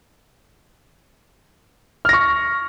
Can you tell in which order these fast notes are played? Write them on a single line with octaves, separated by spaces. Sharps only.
F6 A#6 C#6